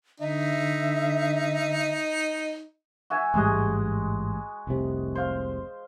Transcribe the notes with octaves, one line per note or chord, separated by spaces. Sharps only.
D3 D#4 E5
F#4 E5 G#5
A1 G#2 G3 G#3 D#5
F1 C2 C3
C5 F5